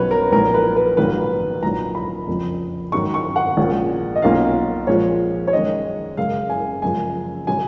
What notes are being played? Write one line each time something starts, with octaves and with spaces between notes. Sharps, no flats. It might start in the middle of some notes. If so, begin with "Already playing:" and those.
Already playing: B1 B2 F#3 C#4 B4 C#5
A#4
B1 A#2 F3 A#4
B4
B4
A#1 G#2 D#3 F#3 A#3 B4
B1 A#2 F#3 A#5
B5
F#1 F2 F3
G#2 D#3 F#3 C#6
C#6
F#5
A#1 A#2 G#3 C#4
D#5
B1 B2 A#3 C#4 F4 F5
A#2 F3 G#3 C#5
C#5
F#2 D#3 G#3 D#5
F#1 F#2 C#3 G#3 F5
G#5
F#1 F#2 F3 G#3 G#5
C#3 F#3 G#5